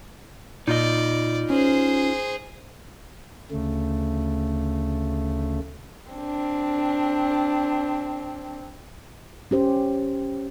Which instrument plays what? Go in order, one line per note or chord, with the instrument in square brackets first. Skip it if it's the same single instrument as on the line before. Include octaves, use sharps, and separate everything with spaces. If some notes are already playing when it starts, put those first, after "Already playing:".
[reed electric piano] A#2 [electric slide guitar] D#4 F4 D#5 [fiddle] D5
[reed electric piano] C#4 [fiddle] G#4 C5
[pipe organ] D2 C#3 A3
[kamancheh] C4 D4
[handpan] C#4 G4 C5